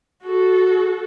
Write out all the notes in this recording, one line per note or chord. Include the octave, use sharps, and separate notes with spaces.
F#4 A4